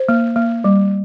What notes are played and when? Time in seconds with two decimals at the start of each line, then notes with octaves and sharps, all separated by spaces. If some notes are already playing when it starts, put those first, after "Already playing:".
Already playing: C5
0.09 A#3
0.36 A#3
0.64 G3